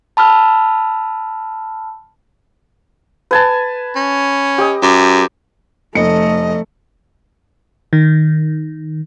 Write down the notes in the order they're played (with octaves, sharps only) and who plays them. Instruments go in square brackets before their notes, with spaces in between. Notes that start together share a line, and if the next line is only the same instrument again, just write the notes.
[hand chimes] A5 B5 E6 F6
[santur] B4 G#5 A5
[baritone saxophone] C#4
[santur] G4 D#5
[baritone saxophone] F#2 [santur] D6
[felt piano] F1 C#7 [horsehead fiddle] A3 [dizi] D#5
[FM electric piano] D#3